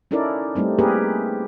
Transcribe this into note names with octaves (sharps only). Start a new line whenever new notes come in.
C#4 D#4 E4 A4 A#4 D5
G3 A3 C4 D#4
A#3 C4 G4 G#4 A#4 B4